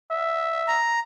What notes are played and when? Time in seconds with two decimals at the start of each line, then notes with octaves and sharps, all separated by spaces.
0.11 E5
0.68 A#5